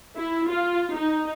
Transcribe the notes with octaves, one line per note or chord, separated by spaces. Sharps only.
E4
F4
D#4